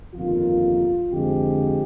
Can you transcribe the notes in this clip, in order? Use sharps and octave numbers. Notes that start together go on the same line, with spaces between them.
G1 F2 D#3 A#3 F4
F2 D3 F3 G#3 G4